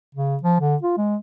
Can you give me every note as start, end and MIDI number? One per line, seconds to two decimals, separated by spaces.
0.15 0.36 49
0.43 0.58 53
0.60 0.76 50
0.82 0.95 65
0.97 1.16 56